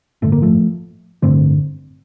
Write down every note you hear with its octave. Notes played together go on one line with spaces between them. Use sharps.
A1 G2 D3 A3
A#3
F3 A3
A1 G2 D3 A3 C4